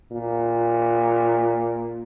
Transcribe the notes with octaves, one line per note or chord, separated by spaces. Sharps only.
A#2